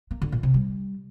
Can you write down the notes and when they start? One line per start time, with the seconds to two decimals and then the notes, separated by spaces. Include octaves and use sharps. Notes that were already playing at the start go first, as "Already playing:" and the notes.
0.11 A#3
0.22 D3
0.32 A#2
0.43 C3
0.54 G3